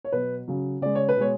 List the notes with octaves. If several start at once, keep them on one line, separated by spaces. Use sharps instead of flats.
C#5
B2 F#3 B4
C#3 F#3
C#3 G#3 D5
C#5
B4
B2 G#3 C#5